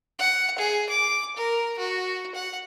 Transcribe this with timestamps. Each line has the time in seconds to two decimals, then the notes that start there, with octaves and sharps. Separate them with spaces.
0.19 F#5
0.58 G#4
0.89 D6
1.36 A#4
1.78 F#4
2.35 F#5